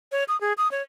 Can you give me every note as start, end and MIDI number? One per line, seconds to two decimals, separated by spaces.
0.12 0.24 73
0.28 0.39 87
0.41 0.53 68
0.58 0.70 87
0.71 0.82 73